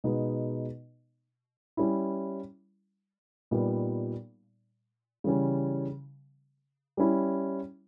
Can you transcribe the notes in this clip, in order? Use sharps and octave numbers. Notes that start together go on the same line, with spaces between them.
B2 G#3 B3 D#4
G3 C#4 E4
A#2 G3 B3 D#4
C#3 E3 G3 C#4
G3 C#4 E4